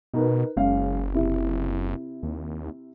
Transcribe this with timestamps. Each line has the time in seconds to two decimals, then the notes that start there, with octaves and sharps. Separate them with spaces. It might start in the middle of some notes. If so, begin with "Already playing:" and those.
0.14 B2 D#4 A#4 B4
0.57 F#1 G#3 C#4 F5
1.14 C3 E4
2.23 D#2